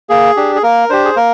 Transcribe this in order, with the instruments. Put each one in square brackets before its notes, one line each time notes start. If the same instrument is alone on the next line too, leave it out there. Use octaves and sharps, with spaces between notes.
[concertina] A#3 G#4
D4 G4
G#4
A#3 A#4
D4 G4 C5
G#4
A#3 A#4